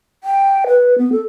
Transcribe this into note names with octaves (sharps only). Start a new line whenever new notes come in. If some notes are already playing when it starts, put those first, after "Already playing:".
G5
B4
B3
A4